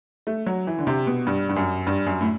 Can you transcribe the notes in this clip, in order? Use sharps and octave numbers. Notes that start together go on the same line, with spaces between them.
A3
F#3
E3
D3
C3
B2
G2
G2
F#2
G2
F#2
A2